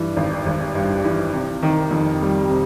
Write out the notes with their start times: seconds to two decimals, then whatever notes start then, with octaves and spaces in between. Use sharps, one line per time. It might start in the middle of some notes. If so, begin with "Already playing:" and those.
Already playing: G2 E3
0.16 G#1
0.46 G#1
0.75 G2
1.04 E3
1.33 C3
1.63 D#3
1.91 F2
2.21 G3
2.50 C3